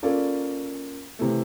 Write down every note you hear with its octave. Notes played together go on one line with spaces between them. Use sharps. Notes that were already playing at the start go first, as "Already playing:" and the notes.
A#3 C#4 F4 A4 D5
C3 E3 A3